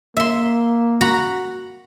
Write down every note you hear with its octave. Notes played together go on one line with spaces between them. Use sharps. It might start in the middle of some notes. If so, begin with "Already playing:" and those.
A#3 E5 C6
F#4 A#5 B5